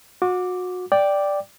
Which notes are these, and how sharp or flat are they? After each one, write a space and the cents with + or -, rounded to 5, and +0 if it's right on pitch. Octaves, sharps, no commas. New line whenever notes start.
F#4 -30 D6 +0
D5 +0 G5 +0 D6 +0